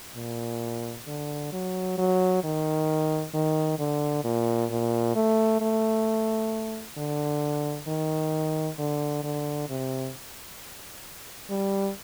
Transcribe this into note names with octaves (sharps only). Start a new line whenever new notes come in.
A#2
D3
F#3
F#3
D#3
D#3
D3
A#2
A#2
A3
A3
D3
D#3
D3
D3
C3
G3